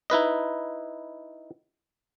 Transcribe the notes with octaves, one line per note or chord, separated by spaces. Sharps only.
D#4 E4 B4 D#5